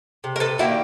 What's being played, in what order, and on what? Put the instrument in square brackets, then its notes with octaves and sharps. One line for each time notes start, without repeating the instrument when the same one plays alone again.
[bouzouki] C3
A#4
A4 B4
D#3 G3 A#3 E4 F#4